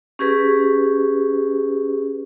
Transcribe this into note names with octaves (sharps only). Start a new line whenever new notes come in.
C#4 G4 G#4 B4